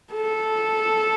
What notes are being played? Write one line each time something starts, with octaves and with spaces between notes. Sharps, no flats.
A4